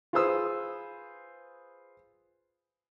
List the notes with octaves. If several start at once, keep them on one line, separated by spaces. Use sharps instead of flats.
F4 G#4 B4 C5 D#6 E6